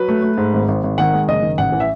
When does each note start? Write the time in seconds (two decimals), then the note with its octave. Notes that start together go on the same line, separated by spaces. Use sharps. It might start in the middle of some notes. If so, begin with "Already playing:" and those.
Already playing: F#3 B4
0.09 A3
0.23 A3
0.38 G#2
0.53 G#1
0.68 G#1
0.84 G#1
0.98 D#3 F#5
1.13 G#3
1.28 F#1 D#5
1.42 D#3
1.58 A1 F#5
1.72 E3
1.80 E5